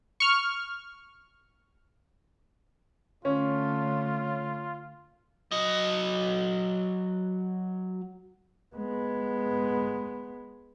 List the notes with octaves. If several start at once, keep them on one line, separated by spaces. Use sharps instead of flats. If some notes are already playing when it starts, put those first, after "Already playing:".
C#6 F6
D3 A3 C#4 F4 C#5
F#3 D#5
G#3 B3